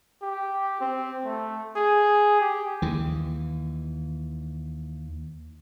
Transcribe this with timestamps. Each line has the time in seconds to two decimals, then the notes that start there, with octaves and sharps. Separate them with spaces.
0.22 G4
0.80 C4
1.25 A3
1.76 G#4
2.41 G4
2.82 D#2 E3